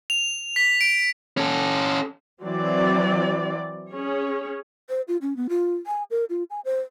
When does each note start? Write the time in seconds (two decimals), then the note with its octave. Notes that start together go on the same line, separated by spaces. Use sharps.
0.10 F7
0.56 B6
0.81 D7
1.37 C#4 A4
2.43 E3 F#3 C4 D5
3.91 C#4 G#4 C#5
4.89 C5
5.08 F4
5.22 C#4
5.37 B3
5.49 F4
5.87 G#5
6.11 A#4
6.30 F4
6.50 G#5
6.65 C5